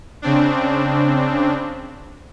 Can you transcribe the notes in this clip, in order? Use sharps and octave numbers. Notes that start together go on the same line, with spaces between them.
C#3 C4 D4